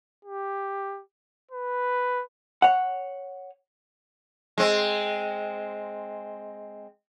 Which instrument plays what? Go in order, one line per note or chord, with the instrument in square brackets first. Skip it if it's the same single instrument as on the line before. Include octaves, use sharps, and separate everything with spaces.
[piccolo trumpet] G4
B4
[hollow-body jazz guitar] C#5 F#5
[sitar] G#3 C4